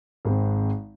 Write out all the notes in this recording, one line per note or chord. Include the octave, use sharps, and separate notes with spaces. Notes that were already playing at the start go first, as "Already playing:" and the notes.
G#1 G#3 C4